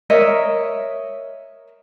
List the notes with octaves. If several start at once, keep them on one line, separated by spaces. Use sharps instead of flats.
A#4 C#5 D#5 E5